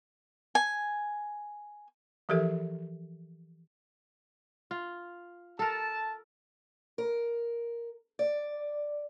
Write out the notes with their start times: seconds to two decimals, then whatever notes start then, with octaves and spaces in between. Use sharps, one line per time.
0.55 G#5
2.29 E3 F3 G4 A4 A#4 E5
4.71 F4
5.59 A4 A#4 A5
6.98 A#4
8.19 D5